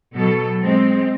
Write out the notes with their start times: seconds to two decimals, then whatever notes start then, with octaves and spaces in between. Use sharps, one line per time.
0.14 B2 F#3 A4
0.62 G#3 C4